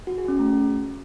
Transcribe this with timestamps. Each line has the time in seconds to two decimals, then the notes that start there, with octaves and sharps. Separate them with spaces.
0.07 F#4
0.18 G#4
0.28 C#4
0.39 A3